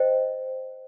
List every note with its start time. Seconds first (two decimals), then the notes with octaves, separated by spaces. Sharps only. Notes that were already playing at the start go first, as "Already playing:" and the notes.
Already playing: C5 D#5 G5